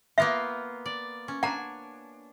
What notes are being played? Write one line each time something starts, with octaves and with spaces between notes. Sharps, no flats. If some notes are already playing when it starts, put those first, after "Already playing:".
A#3 B3 F4 E5
D5
C#4
D4 C#5 F#5 G#5 A#5